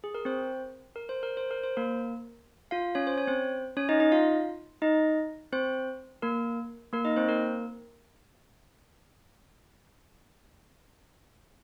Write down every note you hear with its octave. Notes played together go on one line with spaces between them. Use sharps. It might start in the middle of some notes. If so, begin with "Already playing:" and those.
G#4
A#4
C4 C5
A#4
C5
A#4
C5
A#4
C5
A#3 A#4
F4 F5
C#4 C#5
C5
C#5
C4 C5
C#4 C#5
D#4 D#5
D#4 D#5
F4 F5
D#4 D#5
C4 C5
A#3 A#4
A#3 A#4
D#4 D#5
C4 C5
A#3 A#4